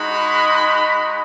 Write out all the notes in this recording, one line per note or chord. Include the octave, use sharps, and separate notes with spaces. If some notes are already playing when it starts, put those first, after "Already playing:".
Already playing: G#3 D#4 F#4 B5